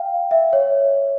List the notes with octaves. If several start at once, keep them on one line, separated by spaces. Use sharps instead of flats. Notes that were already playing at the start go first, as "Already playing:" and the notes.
Already playing: F5 G5
E5
C#5